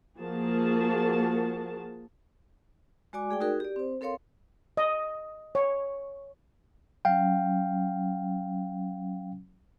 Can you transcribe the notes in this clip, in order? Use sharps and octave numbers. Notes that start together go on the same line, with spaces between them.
F3 A#3 F#4 G#4 A#4 A5
G#3 F#4 D5 G#5 D6
A3 G#4 D5 G5
D#4 F#4 G#4 A#4
G4 D5
C4 C5
C4 A4 A#4 C#5 F5 C6
D#5
C#5
F#3 C#4 F5 G5